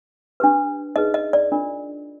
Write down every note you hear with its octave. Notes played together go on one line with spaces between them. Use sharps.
D4 G4 B4
D#4 G#4 B4 D#5
D#5
D5
D4 F4 A#4